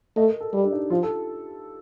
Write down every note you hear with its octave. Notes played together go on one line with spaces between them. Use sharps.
A3 D#5
A#4
A4
G3 G4
D4
D#4
F3 F4
A4